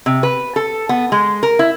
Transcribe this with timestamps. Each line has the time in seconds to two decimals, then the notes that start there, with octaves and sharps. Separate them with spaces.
0.06 C3
0.23 B4
0.56 A4
0.89 B3
1.12 G#3
1.43 A#4
1.59 E4